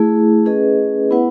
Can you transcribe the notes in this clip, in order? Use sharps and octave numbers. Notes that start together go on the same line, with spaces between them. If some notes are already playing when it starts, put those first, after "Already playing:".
Already playing: A3 E4 G#4
C#4 G#4 B4 D#5
B3 E4 B4 F#5